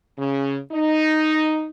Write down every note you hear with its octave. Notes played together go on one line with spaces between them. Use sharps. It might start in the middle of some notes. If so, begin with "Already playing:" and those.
C#3
D#4